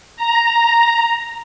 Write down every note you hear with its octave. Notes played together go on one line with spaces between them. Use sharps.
A#5